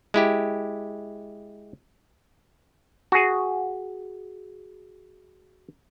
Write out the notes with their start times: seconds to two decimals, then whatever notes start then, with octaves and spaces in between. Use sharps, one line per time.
0.14 G#3 E4 G4
3.12 F#4 G#4